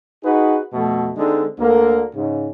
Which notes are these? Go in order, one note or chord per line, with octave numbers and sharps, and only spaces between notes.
D#4 F#4 G#4 B4
F2 B2 A3
D3 G#3 C4 D4 D#4
D2 D3 A#3
G#2 C#3